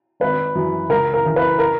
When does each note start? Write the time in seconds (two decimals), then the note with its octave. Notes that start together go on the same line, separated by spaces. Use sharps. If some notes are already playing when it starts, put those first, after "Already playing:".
0.20 G#1 B4
0.55 F#2 E3
0.89 C#2 A#4
1.14 A#4
1.25 C#3 E3
1.36 B4
1.59 A#4